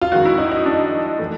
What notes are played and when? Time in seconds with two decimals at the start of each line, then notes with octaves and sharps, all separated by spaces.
0.01 F4
0.12 F#2 D#3 G#3 F#4
0.25 E4
0.38 D#4
0.52 D#4
0.66 D4
1.19 E3 A3